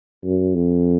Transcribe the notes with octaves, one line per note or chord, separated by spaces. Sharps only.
F#2
F2